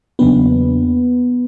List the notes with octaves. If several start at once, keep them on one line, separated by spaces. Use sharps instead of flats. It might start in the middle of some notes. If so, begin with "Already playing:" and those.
E2 C#3 F#3 A#3 B3 D4 B4